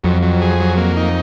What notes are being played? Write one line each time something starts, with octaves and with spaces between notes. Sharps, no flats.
F2 F#3
F#3
G#4
F#3
A#3
D#4